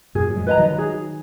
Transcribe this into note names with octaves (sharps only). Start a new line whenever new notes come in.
F#2 A#2 G#4
F#3
F3 G#3
B4 D#5 A#5
D#3 F#3
G#4